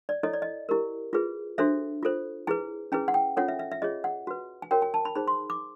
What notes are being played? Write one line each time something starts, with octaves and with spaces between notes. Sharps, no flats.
D5
E4 A4 C#5 D#5
D5
D#5
E4 G4 A#4
F4 G#4 B4
D4 F#4 A4 C5 E5
F4 A4 C5
E4 G#4 B4 G#5
C#4 E4 G#4 B4 G#5
F#5
G5
C#4 F4 A4 C#5 F#5
E5
E5
E5
F4 G#4 C#5 D#5
F#5
F#4 B4
G#5
F#4 A#4 C#5 G5
G#5
A5
B5
D#4 G#4 C5 B5
C6
D6